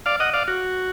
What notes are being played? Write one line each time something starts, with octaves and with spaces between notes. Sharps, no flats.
D5 F5
D#5 F#5
D5 F5
F#4